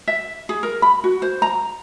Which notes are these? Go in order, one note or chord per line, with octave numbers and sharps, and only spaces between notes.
E5
G#4
A#4
B5
F#4
C5
A#5